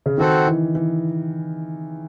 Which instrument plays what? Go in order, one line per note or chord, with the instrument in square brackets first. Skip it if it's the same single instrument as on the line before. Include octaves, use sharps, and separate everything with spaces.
[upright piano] C#3
[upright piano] D#3 [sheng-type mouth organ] C4 F#4 A4 C5 F#5
[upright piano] E3
E3